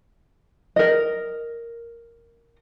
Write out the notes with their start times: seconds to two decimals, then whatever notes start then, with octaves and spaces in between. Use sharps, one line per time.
0.76 A#4 D#5